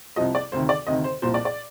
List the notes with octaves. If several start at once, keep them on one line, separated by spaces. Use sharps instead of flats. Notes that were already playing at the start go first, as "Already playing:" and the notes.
C2 C3 F3 D#5
D5
D2 C3 D#3 C5
D5
D2 C3 D#3 D#5
C5
C2 A#2 F3 C5
D5
D5